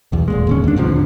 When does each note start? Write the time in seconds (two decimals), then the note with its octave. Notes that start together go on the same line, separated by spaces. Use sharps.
0.12 B1 E2
0.28 D#1 A#2 G#3
0.47 D1 D#2 C#4
0.64 D#2 D4
0.76 C#2 G#2 C3 F3
0.88 D3